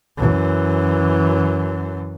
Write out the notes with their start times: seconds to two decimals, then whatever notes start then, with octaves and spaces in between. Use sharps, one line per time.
0.17 F#2 E3